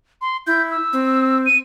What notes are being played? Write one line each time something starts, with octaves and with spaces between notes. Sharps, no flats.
C6
E4 G6
E6
C4
D#7